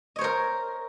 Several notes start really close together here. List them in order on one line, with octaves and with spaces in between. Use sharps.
D#5 C#5 C5 A#4